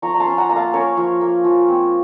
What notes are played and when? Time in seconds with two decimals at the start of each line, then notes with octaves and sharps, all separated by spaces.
0.02 F3 A#5 C#6
0.14 A#5
0.20 A5 C6
0.26 C#4
0.38 F#5 A#5
0.49 A#3 A#5
0.56 F5 A5
0.73 C#4 A#4 C#5
0.97 F3
1.21 A#3
1.44 F3
1.68 C4